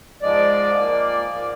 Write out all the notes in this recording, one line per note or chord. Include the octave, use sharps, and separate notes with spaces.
G#2 F3 G#3 D5
A#2 F3 A#3
G#2 F3 A#3